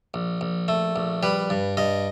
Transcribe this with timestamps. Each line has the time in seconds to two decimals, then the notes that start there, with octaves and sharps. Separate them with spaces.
0.14 A#1
0.41 A#1
0.68 A3
0.96 A#1
1.23 G3 B4
1.50 G2
1.77 G2 D#5